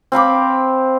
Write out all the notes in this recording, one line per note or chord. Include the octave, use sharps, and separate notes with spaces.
C4 F5 B5 D6